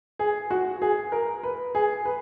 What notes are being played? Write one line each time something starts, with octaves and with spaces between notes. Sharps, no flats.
G#4
F#4
G#4
A#4
B4
G#4
B4